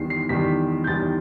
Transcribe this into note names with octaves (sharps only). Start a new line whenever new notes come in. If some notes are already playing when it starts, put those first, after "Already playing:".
Already playing: E2 D#3 G3 C7
C7
E2 D#3 G3 B6
G6
E2 D#3 G3 A6